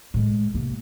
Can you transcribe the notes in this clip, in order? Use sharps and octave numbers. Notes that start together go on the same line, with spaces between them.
A2 G#3
C3 A#3